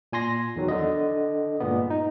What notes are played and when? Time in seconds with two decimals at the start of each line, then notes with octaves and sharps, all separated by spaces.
0.13 A#2 G#5 C6 A#6
0.56 E2 D#3 F#3
0.68 D3 D#5
1.60 G2 A#2 G#3 B3
1.90 D#4